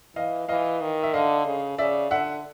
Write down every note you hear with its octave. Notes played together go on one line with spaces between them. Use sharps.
E3 D#5 F5
E3 D#5 F5
D#3
E5
D3 D#5 F5
C#3
C#3 D5 E5
D3 E5 F#5